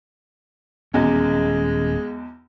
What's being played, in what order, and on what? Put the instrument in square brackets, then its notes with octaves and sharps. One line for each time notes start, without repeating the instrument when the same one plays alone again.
[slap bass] D#1 C#4 [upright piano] B1 E2 [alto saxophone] G#3